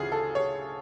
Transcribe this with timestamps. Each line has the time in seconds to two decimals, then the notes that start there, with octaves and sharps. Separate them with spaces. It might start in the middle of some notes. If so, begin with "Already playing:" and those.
Already playing: D2 C#3 E3 F4 G#4
0.12 A4
0.35 C#5